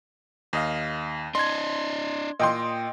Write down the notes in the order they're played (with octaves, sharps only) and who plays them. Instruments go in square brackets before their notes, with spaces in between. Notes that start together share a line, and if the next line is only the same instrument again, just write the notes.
[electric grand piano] D#2 D#5 F5
[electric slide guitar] D4 D#5 [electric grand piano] C6 G#6
[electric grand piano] A#2 [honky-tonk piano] D#5 G5 C6